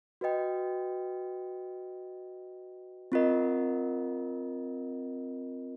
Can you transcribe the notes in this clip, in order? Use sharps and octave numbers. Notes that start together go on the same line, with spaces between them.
F#4 B4 D#5 G5
C4 F4 A#4 D#5